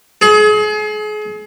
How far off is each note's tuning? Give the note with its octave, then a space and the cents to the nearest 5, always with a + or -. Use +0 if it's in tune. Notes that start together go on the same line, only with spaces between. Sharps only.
G#4 +35